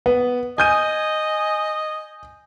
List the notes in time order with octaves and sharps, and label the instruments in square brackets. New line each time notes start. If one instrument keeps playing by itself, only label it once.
[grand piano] B3
[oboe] D#5 [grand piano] G#5 G6 D#7